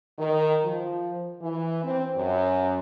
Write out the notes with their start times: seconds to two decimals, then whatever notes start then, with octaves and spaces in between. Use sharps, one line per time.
0.19 D#3
0.64 F3
1.40 E3
1.84 C4
2.17 F#2